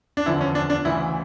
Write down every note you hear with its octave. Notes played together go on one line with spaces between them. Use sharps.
D4
E2 D3 F3 E4
C#4
D4
D4
D2 C#3 E3 E4